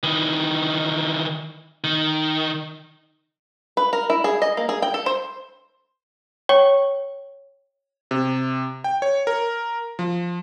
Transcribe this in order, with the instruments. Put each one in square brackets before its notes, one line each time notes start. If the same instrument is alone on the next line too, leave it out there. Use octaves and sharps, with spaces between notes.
[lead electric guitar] D#3 E3
D#3
[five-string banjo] B4
A#4
E4
G#4
D#5
A#3
G#4
G5
A4
C5
[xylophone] C#5 G5 C#6
[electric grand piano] C3
G5
C#5
A#4
F3